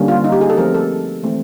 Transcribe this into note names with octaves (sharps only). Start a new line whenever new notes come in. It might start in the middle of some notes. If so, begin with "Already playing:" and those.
Already playing: D3 G3 A#3 C#4
F4
D#4
G4
G#4
A4
F3 A3 C4 A#4
A4
E3 A3 C4